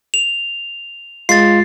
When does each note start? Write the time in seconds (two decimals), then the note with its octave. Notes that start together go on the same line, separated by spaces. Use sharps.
0.14 F7
1.29 G#3 F4 A6 C7